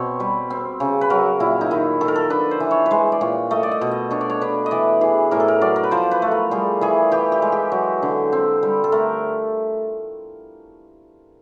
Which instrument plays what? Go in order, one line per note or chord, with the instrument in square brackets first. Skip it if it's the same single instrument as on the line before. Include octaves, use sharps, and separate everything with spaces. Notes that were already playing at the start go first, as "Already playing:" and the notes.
Already playing: [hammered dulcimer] B2 C4 C#5
G3 B4
C4
C#3
B4
F#3 A#4
A#2 E4
D#4
D#3 E4
D#3 A4
A#4
A4
D4 B4
C5
E3
C#5
B4
G#3 C5
D5
A#2 C#5
A3 D#5
D5
D#5
B2
D#5
D4 C#5
D5
C#5
D4 B4
D#5
E3 D5
E3 G#4
A2 A#4
A4
A#4
F#3 D5
A#4
B4
F3 C5
B4
A3
A#4
G3 G#4
E3 G#4
E3 G4
G4
G#3
G4
F#3
D3
C4
G3
A4
A3 A#4